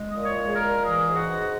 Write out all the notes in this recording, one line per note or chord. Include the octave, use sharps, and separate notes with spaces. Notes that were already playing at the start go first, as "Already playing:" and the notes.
Already playing: G#3
A#2 D#5
C#5
G#3
G#4
A#4
A#2
E3 G#4
G#2
F#4
G#2